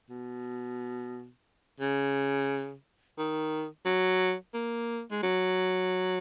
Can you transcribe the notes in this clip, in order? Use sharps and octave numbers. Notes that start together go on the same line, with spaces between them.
B2
C#3
D#3
F#3
A#3
G#3
F#3